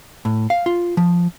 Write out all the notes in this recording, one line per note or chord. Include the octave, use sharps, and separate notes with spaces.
A2
F5
F4
F3